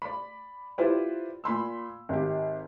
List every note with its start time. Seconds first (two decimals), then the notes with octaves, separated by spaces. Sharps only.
0.02 D5 B5
0.78 E4 F4 G4 B4 C5 D5
1.44 A#2 B5 C6 E6
2.09 G#1 G4